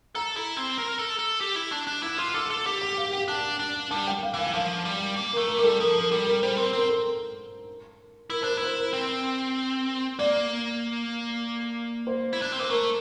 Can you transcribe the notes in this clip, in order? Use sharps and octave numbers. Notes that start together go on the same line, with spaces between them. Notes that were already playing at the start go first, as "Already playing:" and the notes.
A4 A#5
E4
C4
A#4
A4
A4
G4
E4
D4
D4
E4 D6
F4 C6
A4 D6
A4
G4 D6
D6
F5
G5
D4 A5
D4
G3 A5
G5
F5
E3
F5
F3 F5
G3
A#3
A3 A#4
A#4
G3 A#4
A4
F3 A#4
A#4
G3 A4
A#4
G3 C5
C4 A#4
C4 A#4
A4
E4 A#4
D4 A#4 C5
E4 C5
A#4
C4
A#3 D5
C5
E4
D4
C4
A#3 C5
A3 A#4